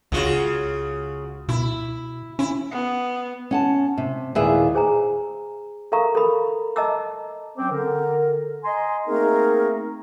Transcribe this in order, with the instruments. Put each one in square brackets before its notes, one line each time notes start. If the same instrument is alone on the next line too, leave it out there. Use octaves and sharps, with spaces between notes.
[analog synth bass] C#2 [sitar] C#3 F4 F#4
[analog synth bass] B2 [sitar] E4
[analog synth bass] C#4 [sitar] E4
[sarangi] B3
[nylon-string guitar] C#4 F#5 A5
C3
D#2 A#2 E4 G#4 B4 E5
[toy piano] G#4 C5 G#5 A#5
A4 A#4 F5 A#5 C#6
A4 A#4 B5
D#5 A5 A#5 D6 E6
[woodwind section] F#3 C4 C#4 C5 G5 D6
D3 A#4
D#5 G#5 A#5 C6
A3 A#3 C4 D#4 G#4 A#4